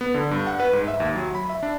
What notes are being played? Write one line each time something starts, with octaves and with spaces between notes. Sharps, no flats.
B3
D3
G2
F#5
B4
G#2
E5
D#2
F#3
B5
E5
D4